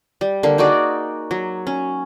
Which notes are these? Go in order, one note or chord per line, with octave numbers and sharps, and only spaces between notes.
G3
D3 A#3
D#4 F#4 G#4 D5
F#3
C#4